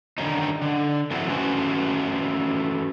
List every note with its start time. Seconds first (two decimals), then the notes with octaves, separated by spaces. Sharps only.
0.18 D3 D#3 G3 C#4 D#4
0.62 D3
1.11 F3 A3 C4 E4 F#4
1.27 E3 A3 C#4 F#4 B4 C5